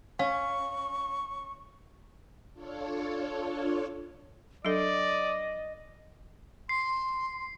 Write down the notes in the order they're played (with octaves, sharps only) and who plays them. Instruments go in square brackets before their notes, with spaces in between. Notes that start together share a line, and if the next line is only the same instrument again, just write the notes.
[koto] C#4 [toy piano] F5 [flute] C#6
[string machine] D4 F4 A4 C#5
[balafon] F#3 D4 A4 [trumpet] D5 [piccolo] D#5
[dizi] C6 [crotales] C7